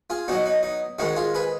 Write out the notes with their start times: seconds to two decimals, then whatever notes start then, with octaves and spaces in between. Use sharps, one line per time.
0.10 F4 G#4
0.28 B2 F#3 D#4 F#4
0.46 D#4
0.63 D#4
0.99 G#2 D#3 G#3 D#4 F#4
1.16 F4 G#4
1.34 G#4 B4